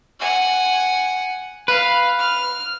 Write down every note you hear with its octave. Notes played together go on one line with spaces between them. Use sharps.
F#5 G#5
B4 F5
F6